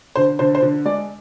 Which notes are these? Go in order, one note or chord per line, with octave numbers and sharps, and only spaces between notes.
D3 C5
D3 C5
C5
D3
G#3 D5